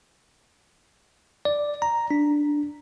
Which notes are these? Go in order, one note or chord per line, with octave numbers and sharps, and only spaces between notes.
D5
A#5
D4